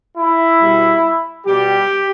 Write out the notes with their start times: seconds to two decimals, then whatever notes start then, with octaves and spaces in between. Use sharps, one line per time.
0.18 E4
0.60 B2 G3
1.46 B2 G3 G4